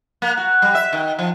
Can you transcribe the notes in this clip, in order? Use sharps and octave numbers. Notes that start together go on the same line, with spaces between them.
A#3
F#4
G3
E5
D#3
F3